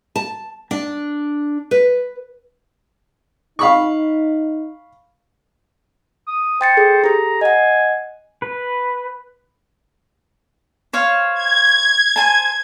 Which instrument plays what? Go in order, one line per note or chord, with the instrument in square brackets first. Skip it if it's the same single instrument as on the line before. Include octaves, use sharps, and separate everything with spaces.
[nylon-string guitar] A5
D4
B4
[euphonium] D#4 [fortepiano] F5 B5 C#6
[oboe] D#6
[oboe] C5 [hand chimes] G5 A6 C#7
[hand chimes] G#4 A4
[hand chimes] G4 A4 [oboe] A#5
[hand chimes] D#5 F#5 [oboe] G#5
[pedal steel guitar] B4
[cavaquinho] C5 C#5 F5
[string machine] G#6
[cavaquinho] C5 G#5 A5